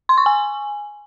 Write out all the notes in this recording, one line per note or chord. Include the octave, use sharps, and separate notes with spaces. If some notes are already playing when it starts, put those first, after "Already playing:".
C6
C#6
G#5